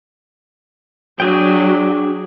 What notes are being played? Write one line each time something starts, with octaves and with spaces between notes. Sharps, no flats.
F#3 D4 G#4 G5